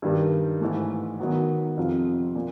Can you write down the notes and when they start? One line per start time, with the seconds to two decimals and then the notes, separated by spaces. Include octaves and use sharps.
0.02 G2 D#3 G3
0.61 G#2 E3 A3
1.20 D#3 F#3 B3
1.77 F2 C3 F3
2.35 A#2